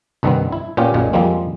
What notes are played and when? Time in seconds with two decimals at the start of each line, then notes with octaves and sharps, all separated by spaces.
0.23 C2 G2 D#3 G3 B3 C4
0.52 E4
0.77 A#2 B3 C#4 F4 G4
0.94 B1 F#2 A#2 G#3
1.13 F2 F3 G3 G#3 A#3 C4